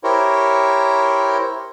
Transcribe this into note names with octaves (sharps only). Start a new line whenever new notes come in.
E4 G4 A#4 C5 C#5